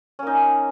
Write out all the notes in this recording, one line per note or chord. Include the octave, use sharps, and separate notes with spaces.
A#3 C#4 D#4